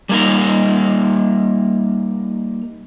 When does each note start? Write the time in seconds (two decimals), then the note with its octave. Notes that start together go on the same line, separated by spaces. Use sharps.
0.09 G3 A#3 D#4 A#4